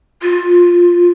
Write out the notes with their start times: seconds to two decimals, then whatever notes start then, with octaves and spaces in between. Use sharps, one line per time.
0.22 F4